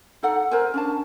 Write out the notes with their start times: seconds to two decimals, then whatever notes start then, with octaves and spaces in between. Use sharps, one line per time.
0.23 D#4 A4 F#5
0.51 A#4 C5 G#5
0.74 C#4 D4 A5